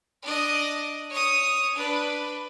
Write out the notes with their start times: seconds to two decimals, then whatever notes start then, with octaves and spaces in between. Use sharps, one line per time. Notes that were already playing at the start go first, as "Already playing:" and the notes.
0.22 D4 D#5
1.10 C#5 D#6
1.75 D4 B4